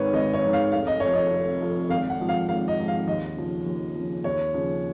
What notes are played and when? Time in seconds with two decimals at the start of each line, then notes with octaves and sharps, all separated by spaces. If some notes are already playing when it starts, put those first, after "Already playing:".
Already playing: G#1 G#2 D#3 B4 C#5
0.14 G#1 D#5
0.34 C#5
0.43 G#2 D#3
0.53 F5
0.72 F1 F5
0.87 D#5
1.00 F2 F3 C#5
1.13 D#5
1.31 F1
1.60 F2 F3
1.90 G#1 F5
2.10 F#5
2.19 G#2 F3
2.29 F5
2.48 G#1 F5
2.68 D#5
2.78 G#2 F3
2.88 F5
3.07 D#2 D#5
3.37 C#3 F3
3.66 D#2
3.95 C#3 F3
4.24 D#2 C#5
4.54 C#3 F3